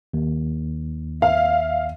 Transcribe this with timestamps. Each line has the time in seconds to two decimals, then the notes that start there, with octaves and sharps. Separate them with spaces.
0.13 D#2
1.22 E5 F5